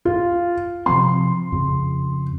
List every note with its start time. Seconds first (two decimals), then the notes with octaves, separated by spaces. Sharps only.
0.05 F4
0.86 C3 F3 C4 C6
1.52 F2 C#3